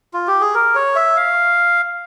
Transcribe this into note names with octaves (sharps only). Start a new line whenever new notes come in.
F4
G4
G#4
A#4
C#5
E5
F5